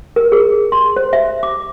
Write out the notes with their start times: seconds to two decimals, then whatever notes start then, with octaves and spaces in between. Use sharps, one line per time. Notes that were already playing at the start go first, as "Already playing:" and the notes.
0.16 A#4
0.32 G#4
0.72 C6
0.96 C5
1.13 E5
1.43 D6